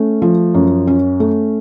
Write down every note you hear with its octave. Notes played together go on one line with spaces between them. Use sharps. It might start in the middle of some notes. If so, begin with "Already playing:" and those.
Already playing: A3 C#4
F3
F#2
C#4
A3